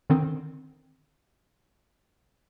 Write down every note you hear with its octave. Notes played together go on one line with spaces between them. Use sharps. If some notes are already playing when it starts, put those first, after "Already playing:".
D3 D#3 C4